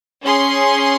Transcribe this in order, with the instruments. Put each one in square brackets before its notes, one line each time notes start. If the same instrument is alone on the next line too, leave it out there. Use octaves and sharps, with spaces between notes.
[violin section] C#4 G#4 C6